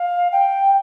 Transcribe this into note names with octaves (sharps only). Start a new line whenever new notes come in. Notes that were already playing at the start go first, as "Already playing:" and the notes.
Already playing: F5
G5